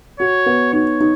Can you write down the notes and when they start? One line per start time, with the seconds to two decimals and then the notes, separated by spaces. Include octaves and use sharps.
0.20 F#4 C#5
0.46 B3
0.73 D#4 C#5
1.01 D#4